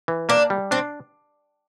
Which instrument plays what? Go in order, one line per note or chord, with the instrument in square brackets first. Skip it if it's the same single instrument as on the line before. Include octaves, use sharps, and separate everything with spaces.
[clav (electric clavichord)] E3
[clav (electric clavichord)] A#3 [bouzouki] D4
[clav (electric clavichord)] G3
[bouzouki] C4 [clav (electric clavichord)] D4